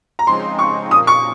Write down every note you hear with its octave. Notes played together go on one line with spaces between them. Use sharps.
A#5
C#3 F3 G#3 C4 D#4 C6
C#6
A#2 F3 A#3 D#6
C#6